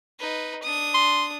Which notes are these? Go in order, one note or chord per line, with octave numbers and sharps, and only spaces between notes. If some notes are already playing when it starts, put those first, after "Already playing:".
D#4 B4
D4 D#6
C6